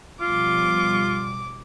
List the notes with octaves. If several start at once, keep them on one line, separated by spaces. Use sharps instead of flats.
B2 F3 G3 F4 D6